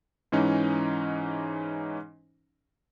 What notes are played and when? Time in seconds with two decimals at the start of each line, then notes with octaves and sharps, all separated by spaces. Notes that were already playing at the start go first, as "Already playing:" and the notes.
0.32 G#2 E3 C#4 D#4